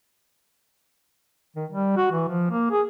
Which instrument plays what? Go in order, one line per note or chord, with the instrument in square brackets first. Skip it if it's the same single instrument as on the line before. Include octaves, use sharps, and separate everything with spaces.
[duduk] D#3
G3
F#4
E3
F3
A#3
G#4